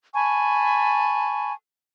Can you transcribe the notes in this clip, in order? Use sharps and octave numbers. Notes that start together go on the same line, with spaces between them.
G#5 A5 B5 C#6